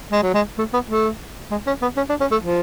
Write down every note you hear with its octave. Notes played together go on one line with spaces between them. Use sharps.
G#3
F#3
G#3
A3
B3
A3
G#3
C#4
B3
C#4
D4
C#4
A3
F3